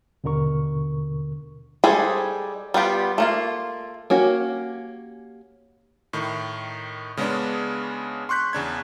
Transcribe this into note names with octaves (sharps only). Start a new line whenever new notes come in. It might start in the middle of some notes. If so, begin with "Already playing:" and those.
D#2 B2 D3 A#4 C#6
G3 G#3 G#4 A4 C5
G3 B3 F4 G4
A3 A#3 F4
A#3 C#4 F#4 G4
A2 D#3
C#3 G#3 B3 C#4 D4
C6 C#6 F#6 G6 B6
E2 C#3 D4 G#6